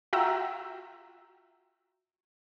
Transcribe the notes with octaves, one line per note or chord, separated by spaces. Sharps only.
F4 F#4 E5 G5 A#5 E6